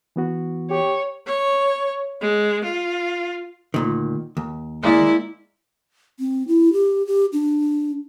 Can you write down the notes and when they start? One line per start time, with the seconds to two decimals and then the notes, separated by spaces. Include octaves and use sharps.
0.16 E3 B3 F#4
0.71 G4 C#5
1.26 C#5
2.21 G#3
2.64 F4
3.74 D2 A#2 D#3
4.37 D#2
4.83 G#3 A#3 E4 D5
6.19 C4
6.47 E4
6.73 G4
7.07 G4
7.33 D4